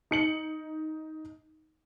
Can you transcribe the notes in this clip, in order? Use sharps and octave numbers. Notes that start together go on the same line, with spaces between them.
D#4 C#7 F#7